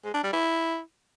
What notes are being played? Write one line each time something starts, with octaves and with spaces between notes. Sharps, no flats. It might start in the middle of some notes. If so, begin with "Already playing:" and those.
G#3
D4
G3
E4